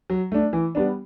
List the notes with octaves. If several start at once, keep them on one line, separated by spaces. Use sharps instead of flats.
F#3
A3 D4
E3
G3 B3 D4